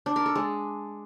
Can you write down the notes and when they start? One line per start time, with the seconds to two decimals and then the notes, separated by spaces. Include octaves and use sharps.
0.06 D4
0.16 A#4
0.26 A4
0.35 G#3